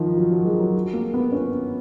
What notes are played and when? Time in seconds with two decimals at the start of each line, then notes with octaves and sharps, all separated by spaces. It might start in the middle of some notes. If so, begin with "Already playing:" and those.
Already playing: D#3 F3
0.17 F#3
0.31 F#3
0.45 G#3
0.60 F#3
0.93 A#3
1.14 B3
1.32 C#4